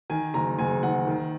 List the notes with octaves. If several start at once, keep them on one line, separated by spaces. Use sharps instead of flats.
D#3 G#5
F#1 A#5
F#1 G#5
D#3 F#5
D#3